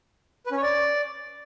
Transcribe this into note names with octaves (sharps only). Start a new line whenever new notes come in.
B4
C#4
C#5
D5